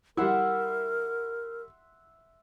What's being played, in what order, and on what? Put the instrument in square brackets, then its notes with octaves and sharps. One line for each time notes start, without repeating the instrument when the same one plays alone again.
[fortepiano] G3 E4 [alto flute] A#4 [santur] E5 F#5 C6